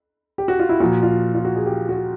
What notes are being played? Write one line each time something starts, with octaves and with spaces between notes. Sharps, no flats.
G4
F#4
F4
E4
A#2 F3 F#4
F4
F4
F#4
G#4
G4
F#4